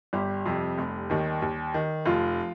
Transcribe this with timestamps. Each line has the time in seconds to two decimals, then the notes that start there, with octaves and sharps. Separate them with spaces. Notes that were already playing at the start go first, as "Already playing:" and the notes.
0.13 G1 G3 G4
0.46 F2 C3
0.78 F1
1.10 D#2 D#3
1.42 D#2
1.74 D#3
2.06 F1 F3 F4